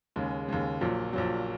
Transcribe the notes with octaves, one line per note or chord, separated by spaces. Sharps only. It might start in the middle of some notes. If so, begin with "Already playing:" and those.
D#2 C#3 G#3
D#2 C#3 G#3
A#1 A#2 F#3
A#1 A#2 F#3